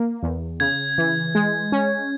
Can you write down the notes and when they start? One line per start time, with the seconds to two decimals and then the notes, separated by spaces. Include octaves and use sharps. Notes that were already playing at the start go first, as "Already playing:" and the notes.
Already playing: A#3
0.23 E2
0.60 C#3 G#6
0.98 E3
1.35 G#3
1.72 C#4